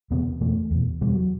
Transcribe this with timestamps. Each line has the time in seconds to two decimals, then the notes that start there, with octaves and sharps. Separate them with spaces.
0.11 E2 C3 B3
0.41 E2 B2 A3
0.71 E2 B2
1.01 E2 B2 G3
1.13 F#3